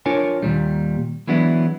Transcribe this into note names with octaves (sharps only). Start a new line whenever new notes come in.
D4 F4 A#4 C#5 G#5
D#2 A#2 G3
E3 F#3 G#3 B3 D4 E4